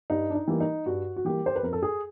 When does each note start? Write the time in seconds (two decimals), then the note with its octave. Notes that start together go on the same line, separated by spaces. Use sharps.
0.10 G2 D#4
0.30 D4
0.35 D#4
0.48 E3 G3 A#3
0.60 D#4
0.86 G2 F#4
1.16 F#4
1.25 E3 G3 A#3 G4
1.46 C5
1.56 B4
1.63 F2 A#4
1.73 A4
1.83 G#4